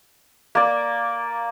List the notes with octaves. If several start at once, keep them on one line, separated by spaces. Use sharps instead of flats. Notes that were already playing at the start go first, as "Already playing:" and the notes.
A#3 D5